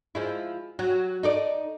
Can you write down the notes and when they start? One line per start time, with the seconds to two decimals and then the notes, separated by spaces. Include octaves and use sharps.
0.15 F3 G#3 E4
0.79 F#3
1.23 D#4 A4 D5